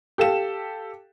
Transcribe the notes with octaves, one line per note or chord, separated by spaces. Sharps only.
G4 A4 F5 E7